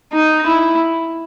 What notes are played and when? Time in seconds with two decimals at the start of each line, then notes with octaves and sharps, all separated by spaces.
0.12 D#4
0.46 E4